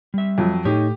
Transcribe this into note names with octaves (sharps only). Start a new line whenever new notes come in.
G3 E5
F2 F#3
A2 A3 D#4 G4 C#5